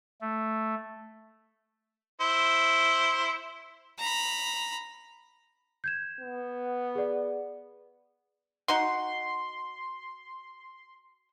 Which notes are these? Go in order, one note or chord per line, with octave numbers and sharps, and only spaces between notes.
A3
E4 C5
A#5 B5
G6 G#6 E7
B3
G#4 D5
D#4 F#4 F#5 C6